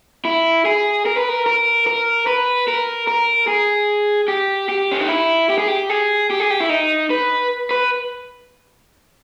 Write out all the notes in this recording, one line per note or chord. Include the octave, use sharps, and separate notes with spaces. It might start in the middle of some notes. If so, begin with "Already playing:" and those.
E4
G#4
A#4
B4
A#4
A#4
A#4
B4
A#4
A#4
G#4
G4
G4
C#4
D#4
E4
G4
G#4
G4
G#4
G4
G#4
G4
E4
D#4
B4
B4